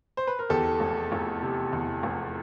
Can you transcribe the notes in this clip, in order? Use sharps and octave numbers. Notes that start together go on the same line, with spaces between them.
C5
B4
A#4
E2 G4 A4
F1
F1
C3
E2
F1